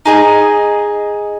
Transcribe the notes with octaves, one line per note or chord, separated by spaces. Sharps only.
D#4 G#4 D#5